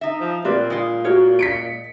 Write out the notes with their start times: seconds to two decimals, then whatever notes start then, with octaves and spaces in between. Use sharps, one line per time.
0.01 D#4 E5
0.20 F3
0.45 A#2 C4 A#4 B4 D5
0.70 G#3 F4
1.05 F#4 A#4 C#5
1.39 D#5 B6 C#7 D7